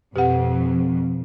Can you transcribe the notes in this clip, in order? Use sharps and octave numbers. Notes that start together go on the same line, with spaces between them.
F2 B2 G4 F#5